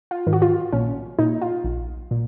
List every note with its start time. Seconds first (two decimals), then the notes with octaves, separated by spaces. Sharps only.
0.11 F4
0.27 G#2 D#3
0.33 F#4
0.42 F4
0.73 A#1 C#4
1.19 A#2 D#4
1.42 F4
1.64 A#1
2.11 A#2